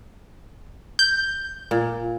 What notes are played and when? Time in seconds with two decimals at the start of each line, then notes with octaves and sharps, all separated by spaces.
0.99 G6
1.71 A#2